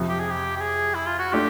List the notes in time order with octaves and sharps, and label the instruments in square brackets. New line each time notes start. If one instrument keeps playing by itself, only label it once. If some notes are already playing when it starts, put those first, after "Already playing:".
Already playing: [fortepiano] F2 C3 F3
[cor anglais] G4
G#4
G4
G4
G#4
E4
F4
F#4
[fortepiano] A3 D4 F4 [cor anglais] G4